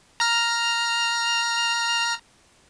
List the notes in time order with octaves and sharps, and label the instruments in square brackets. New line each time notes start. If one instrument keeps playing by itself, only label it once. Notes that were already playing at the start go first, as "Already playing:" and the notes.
[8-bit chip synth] A#5 F6